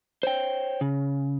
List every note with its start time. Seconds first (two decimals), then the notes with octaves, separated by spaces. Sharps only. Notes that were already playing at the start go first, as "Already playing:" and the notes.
0.23 C5 C#5 G5
0.81 C#3